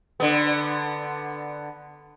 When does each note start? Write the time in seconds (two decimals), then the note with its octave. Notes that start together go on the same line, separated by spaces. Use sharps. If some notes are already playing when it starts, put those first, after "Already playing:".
0.20 D3 B3